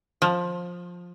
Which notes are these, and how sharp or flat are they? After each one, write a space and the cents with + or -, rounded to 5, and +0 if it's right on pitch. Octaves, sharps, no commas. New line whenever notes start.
F3 +15